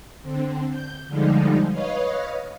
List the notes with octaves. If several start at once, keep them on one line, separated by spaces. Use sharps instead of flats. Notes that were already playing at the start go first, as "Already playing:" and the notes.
D3 C4
G6
D3 F3 G3 G#3 D#4
B4 C#5 D#5 F5